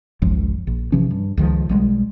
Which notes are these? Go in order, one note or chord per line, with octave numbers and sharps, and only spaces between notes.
G#1 C#2 F#2 F3
A#1
C3 E3 F3 C#4
G2
C#2 D#3 F3
B1 G3 G#3